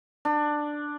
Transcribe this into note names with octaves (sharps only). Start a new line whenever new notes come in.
D4